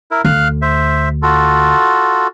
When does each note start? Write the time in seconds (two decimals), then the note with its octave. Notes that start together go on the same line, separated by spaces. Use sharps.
0.11 E4 A#4
0.25 D2 F5 F6 F#6
0.62 C5 E5
1.22 F4 F#4 A4